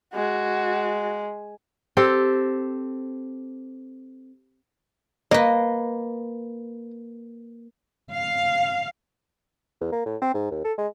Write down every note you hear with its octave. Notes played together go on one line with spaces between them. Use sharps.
G#3 F#4
C4 G4 A4
A#3 B4 D#5
F5
E2
A#3
A2
C4
G#2
D#2
A4
G#3